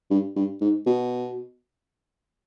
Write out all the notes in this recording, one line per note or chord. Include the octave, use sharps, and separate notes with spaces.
G2
G2
G#2
B2